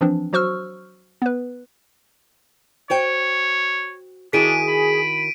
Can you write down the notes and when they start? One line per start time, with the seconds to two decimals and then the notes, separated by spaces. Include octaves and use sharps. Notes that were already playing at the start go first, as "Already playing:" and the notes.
0.01 E3 F3 C4 D4
0.33 F#3 F#4 C5 C#6 E6 F6
1.22 B3 B4
2.90 F#4 C5 C#5 G5
4.33 D#3 D4 E4 F#4 G#4 B6 D7 D#7
4.68 B5